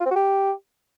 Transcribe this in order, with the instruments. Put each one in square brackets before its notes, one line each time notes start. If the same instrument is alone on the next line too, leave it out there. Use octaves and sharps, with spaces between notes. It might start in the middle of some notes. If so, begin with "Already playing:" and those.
[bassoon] F4
C4
F#4
G4